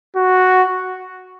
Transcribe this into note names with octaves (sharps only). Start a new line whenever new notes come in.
F#4